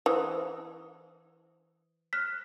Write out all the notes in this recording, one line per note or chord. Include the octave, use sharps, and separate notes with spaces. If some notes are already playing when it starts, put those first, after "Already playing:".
E3 C5 D#6
F6 F#6 B6